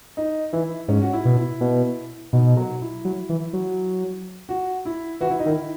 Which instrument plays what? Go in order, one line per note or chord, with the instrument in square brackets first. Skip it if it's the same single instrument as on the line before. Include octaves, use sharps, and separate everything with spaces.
[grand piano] D#4
[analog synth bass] E3 [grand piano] E4
[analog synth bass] G#2 [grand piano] C#4
[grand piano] F#4
E4
[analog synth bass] B2
[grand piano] E4
[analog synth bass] B2
[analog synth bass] B2 [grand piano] D#4
[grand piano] F#3
E4
[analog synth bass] F#3
E3
F#3
[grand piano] F#4
E4
[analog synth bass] E3 [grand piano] F#4
[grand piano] E4
D#4
[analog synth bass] D#3 [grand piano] E4